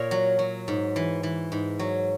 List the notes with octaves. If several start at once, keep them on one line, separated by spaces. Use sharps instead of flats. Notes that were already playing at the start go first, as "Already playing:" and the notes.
Already playing: A#2 A#4 C#5
F#3
F#3
G#2
E3
E3
G#2
F#3